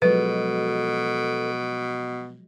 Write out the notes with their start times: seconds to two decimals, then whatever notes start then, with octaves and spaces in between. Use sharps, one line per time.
0.02 B2 F3 F#3 G#3 A4 B4